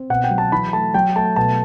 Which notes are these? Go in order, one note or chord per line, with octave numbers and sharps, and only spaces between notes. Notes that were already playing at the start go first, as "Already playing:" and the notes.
Already playing: C4
B2 F#5
G5
F#3
A5
E3 B5
A3 A5
F#3 G5
A3 A5
B2 A5